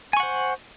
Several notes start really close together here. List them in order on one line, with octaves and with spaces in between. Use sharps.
G#5 C#6 F#5 C5